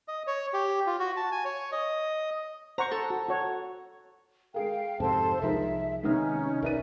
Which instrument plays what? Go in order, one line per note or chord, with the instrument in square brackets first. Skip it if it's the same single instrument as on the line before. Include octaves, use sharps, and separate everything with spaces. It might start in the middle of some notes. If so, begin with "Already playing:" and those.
[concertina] D#5
C#5
G4
F4
F#4
A5
G#5
C#5
D#5
[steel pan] C5 F#5 C#6 [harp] A#5
[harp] A4
[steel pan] F#4
F#4 C#5
[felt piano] G#3 G#4 A#4 [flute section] F5 G5
[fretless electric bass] F2 G#2 C3 [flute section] A4 C5 A5
[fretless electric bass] C2 F3 [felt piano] G#3 D#4 A#4 [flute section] E5
[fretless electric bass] C3 G#3 [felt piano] D#3 B3 F6 [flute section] C#4 D#4
[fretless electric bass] B1 C#4 [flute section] D#4 D5 E5 [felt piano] A#4 B4 D#7